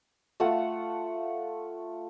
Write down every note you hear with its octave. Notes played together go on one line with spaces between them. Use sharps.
A3 F4 F#5 A5